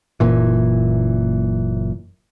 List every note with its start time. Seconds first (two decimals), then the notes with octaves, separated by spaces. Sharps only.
0.20 F#1 A#2 E3